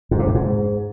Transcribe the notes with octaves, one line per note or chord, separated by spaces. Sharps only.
G#2
C3
F#2
G#2